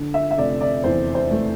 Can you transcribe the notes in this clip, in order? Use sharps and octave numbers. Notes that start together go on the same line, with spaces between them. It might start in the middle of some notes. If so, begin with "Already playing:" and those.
Already playing: D3
E5
E5
F1 D5
D5
E2 C5
C5
A3